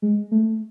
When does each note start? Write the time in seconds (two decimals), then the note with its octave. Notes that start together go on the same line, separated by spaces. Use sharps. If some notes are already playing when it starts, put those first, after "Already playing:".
0.02 G#3
0.32 A3